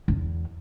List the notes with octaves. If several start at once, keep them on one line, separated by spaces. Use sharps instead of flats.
E2